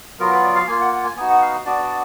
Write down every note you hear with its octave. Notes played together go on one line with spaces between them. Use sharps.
F#3 B3 F4 A#4
B4
D5
F5
A#3 F4 G#5
F#5
F#5
G#5
B3 D#4 F#4 G#5
F#5
F5
B3 D4 F#4 D5
D5